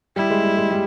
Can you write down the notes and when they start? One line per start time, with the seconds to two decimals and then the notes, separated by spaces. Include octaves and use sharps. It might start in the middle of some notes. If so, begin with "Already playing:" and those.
0.16 G3 E4
0.30 G#3
0.44 G3
0.58 G#3
0.71 G3